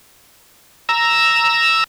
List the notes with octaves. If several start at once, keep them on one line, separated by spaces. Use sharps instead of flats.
A#5 E6